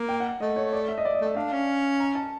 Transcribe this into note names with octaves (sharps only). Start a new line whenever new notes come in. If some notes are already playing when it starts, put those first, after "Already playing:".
Already playing: A#3
G5
F#5
A3 D#5
C#5
D5
E5
D#5
D5
D#5
A3
E5
D4 F5
C#4
A#5
A5